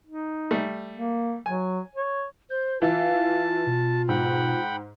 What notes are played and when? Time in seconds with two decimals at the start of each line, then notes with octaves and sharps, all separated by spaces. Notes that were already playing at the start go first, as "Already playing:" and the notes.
0.07 D#4
0.51 G3 A3
0.93 A#3
1.46 F#3 G#5
1.95 C#5
2.50 C5 G6
2.82 E3 F4 F5 A5
3.67 B2
4.09 G#2 F#5 G5 B5